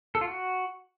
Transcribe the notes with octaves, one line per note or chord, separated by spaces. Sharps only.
A4
F4
F#4